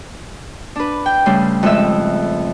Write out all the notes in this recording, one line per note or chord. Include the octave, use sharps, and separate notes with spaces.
D4 B4
G5
C#3 G3 A3 C#4 B4 C6
F2 A2 G#3 G#4 E5 E6